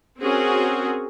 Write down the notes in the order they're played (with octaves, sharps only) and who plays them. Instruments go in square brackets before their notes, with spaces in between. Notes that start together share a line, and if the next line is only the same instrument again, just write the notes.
[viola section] C4 C#4 F#4 G#4 A#4